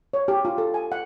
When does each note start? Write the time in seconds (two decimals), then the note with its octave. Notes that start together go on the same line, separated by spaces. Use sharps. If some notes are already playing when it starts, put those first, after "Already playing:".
0.13 C#5
0.28 G4
0.45 F4
0.58 A4
0.74 G#5
0.92 F#5